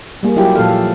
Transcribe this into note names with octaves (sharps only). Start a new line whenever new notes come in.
G3 A#3 G#4
F#3 E4 F4 G4
A#2 F3 A4 F5